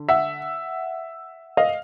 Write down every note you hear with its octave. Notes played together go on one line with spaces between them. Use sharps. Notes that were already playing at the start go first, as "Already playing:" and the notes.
Already playing: D3
E5 F#5
D#5 F5